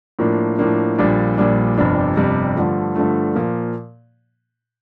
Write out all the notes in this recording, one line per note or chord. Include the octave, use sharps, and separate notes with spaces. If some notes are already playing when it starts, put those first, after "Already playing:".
A2 F3 A#3 D4
A2 F3 A#3 D4
A#1 A#2 G3 D4
A#1 A#2 G3 D4
G1 F2 C3 G3 D4
G1 F2 C3 G3 D4
G2 D3 F3 A3
G2 D3 F3 A3
A#2 F3 A#3